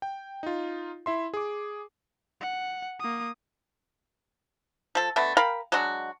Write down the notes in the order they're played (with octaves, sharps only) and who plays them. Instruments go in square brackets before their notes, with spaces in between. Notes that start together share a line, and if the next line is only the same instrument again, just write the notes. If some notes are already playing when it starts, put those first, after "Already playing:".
[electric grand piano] G5
D#4 F4
E4 E5 C6
G#4 D6
[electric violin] F#5
A#3 D#6
[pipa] F3 A4
D3 A3 B3
A#4 F5 G5 B5
F#3 G#3 D4 F#4